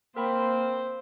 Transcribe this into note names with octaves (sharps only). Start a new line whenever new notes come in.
A#3 C4 A#4 C5 G5 B5